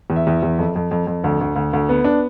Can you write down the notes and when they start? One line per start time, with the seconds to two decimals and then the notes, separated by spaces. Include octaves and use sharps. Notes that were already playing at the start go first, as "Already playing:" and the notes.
0.10 E2
0.16 E5
0.27 E2
0.43 E2
0.59 F2
0.76 F2
0.91 F2
1.07 F2
1.24 D2
1.41 D2
1.56 D2
1.73 D2
1.89 B3
2.04 D4